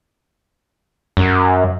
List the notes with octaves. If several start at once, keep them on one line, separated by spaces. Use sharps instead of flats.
F#2